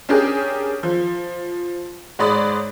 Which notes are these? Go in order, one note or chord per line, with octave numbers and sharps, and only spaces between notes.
C#4 D4 G4 G#4 A#4
F3
G#2 C#5 D5 B5 D#6